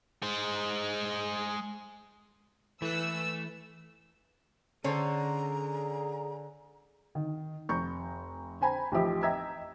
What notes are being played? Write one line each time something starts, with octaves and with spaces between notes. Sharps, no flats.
G#3 C5
E3 A3 E6 F#6
D3 C#4 G#4 A4 C5 C#5 A#5
D#3
F1 A#5 C#6 G6
C5 G5 G#5 A#5 B5
A1 F3 D#4 G4 E5
D#5 E5 G5 A#5 E6 G#6